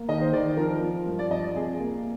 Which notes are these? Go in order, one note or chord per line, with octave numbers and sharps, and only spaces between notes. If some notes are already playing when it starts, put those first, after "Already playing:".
Already playing: A#3
D#3 D#5
C5
D#3 D5
F3 A#4
F3
G2
D5
F3 D#5
D5
C3 G#4
A#3